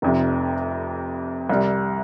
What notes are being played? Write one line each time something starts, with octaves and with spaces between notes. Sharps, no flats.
F1 F2 C3
C2 C3 G3